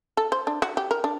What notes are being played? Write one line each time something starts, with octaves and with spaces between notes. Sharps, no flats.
A4
C5
D4
F#4
G4
A#4
D4